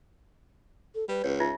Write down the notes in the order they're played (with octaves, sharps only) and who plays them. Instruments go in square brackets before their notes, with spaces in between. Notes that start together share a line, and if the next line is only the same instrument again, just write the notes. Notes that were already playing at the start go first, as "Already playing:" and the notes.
[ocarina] A4
[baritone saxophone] G3 [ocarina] B4
[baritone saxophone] C#2 [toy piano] C#5
[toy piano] D#4 F4 E5